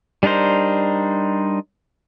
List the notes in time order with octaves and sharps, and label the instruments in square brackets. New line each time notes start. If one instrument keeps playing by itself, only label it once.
[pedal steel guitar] G3 D4 D#4 A#4 C5